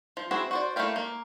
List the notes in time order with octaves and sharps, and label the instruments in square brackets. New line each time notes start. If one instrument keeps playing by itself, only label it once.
[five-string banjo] F3
C4 E4 F#4 G#4
F#4 C5 D5
A3 A#3 E4 F5 G5
A#3